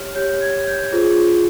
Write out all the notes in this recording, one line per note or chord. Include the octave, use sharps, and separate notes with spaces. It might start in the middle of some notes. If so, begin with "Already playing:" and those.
Already playing: G4 C#5 F6
G4 C#5 G6
G#6
G6
F4 G#4 C5